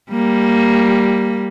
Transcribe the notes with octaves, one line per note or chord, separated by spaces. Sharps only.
G3 A#3